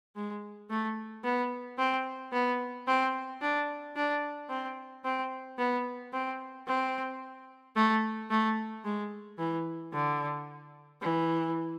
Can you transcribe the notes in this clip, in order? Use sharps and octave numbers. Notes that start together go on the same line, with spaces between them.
G#3
A3
B3
C4
B3
C4
D4
D4
C4
C4
B3
C4
C4
A3
A3
G#3
E3
D3
E3